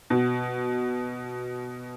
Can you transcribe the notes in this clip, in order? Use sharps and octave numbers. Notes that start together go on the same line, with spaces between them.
B2